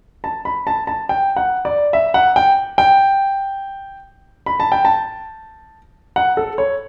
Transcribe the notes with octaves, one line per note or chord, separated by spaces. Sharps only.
A5
B5
A5
A5
G5
F#5
D5
E5
F#5
G5
G5
B5
A5
G5
A5
F#5
A4
C#5